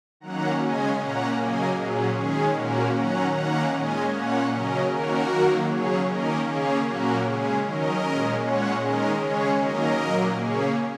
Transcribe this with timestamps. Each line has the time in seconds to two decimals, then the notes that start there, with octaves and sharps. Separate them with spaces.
0.20 D#3 F#3 A#3 C#4 F#5 A#5
0.59 C#3 G#3 C#4 D#5 G#5
0.99 A#2 A#3 C#4 F#5 A#5
1.38 C#3 F#3 A#3 D#5 G#5
1.77 A#2 F#3 C#4 G#4
2.16 D#3 G#3 C#4 G#4
2.55 A#2 A#3 C#4 F#4 A#4
2.94 D#3 F#3 C#4 F#5 A#5
3.33 D#3 A#3 C#4 F#5 A#5
3.72 A#2 G#3 C#4 D#5 G#5
4.11 A#2 A#3 C#4 C#5 F#5
4.51 C#3 F#3 C#4 A#4 D#5
4.90 D#3 A#3 C#4 F#4 A#4
5.29 D#3 F#3 A#3
5.68 C#3 F#3 C#4 G#4 C#5
6.07 D#3 A#3 C#4 A#4 D#5
6.46 C#3 A#3 C#4 G#4 C#5
6.86 A#2 F#3 A#3 C#4 F#4 A#4
7.24 C#3 G#3 C#4 G#4
7.64 D#3 F#3 C#4 A#4 D#5
8.02 A#2 G#3 C#4
8.41 A#2 G#3 C#4 C#5 F#5
8.81 D#3 G#3 C#4 A#4 D#5
9.20 C#3 G#3 C#4 G#4 C#5
9.59 D#3 F#3 A#3 C#4 A#4 D#5
9.98 A#2 F#3 A#3
10.37 C#3 A#3 C#4 G#4 C#5